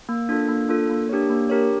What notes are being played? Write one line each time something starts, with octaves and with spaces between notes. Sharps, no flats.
A#3
D4 F4 A4
A#3
D4 F4 A4
A#3
D4 G4 A#4 C#5
A#3
D4 G4 A#4 C#5